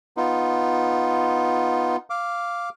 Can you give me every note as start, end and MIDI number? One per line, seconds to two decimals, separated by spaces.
0.17 1.96 59
0.17 1.96 63
0.17 1.96 65
2.10 2.69 77
2.10 2.69 86